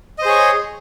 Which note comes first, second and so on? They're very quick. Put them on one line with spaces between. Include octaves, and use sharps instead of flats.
D#5 C5 G#4 C#5